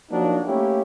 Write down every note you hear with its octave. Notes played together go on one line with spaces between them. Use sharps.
F3 F#3 A#3 D4 D#4 F#4
A3 A#3 C#4 E4 G4